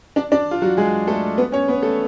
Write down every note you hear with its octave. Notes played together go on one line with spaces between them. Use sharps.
D4 D5
D4 D5
F4
F#3 F#4
G#3 G#4
A3 A4
B3 B4
C#4 C#5
B3 B4
A3 A4